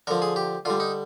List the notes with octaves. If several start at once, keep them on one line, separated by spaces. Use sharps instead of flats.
D3 F3 A#4
G#4
G4
D3 G3 F4
D#4